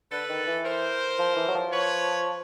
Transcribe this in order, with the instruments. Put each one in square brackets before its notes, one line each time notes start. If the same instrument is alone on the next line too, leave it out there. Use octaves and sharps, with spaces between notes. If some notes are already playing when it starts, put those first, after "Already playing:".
[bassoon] D3 [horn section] A4 B4
[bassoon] D#3
E3
[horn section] A#4 C5
[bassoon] F3
E3
F#3
F3
[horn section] B4 C#5